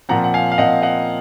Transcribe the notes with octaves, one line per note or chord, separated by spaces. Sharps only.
A#2 F3 C4 F#5 A#5
F#5
F5 G#5
F5
A#2 F3 C4 D#5 F#5
D#5 F#5